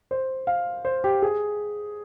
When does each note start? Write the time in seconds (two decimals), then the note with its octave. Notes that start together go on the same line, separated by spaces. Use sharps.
0.11 C5
0.47 F5
0.85 C5
1.04 G4
1.22 G#4